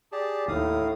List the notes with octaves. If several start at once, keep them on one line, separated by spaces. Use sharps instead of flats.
G4 G#4 D5 A5
D#2 A2 D#4 F5 D#6